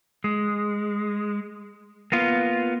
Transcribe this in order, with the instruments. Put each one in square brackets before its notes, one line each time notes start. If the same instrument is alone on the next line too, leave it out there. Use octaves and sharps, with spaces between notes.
[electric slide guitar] G#3
A#3 B3 F4